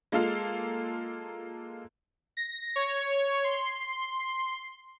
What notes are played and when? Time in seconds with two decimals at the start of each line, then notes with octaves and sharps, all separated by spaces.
0.12 G#3 A#3 F4 A4 F5
2.37 A#6
2.76 C#5
3.44 C6